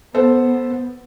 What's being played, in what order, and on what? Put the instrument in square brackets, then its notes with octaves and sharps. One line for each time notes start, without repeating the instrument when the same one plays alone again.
[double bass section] B3 [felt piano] A4 C5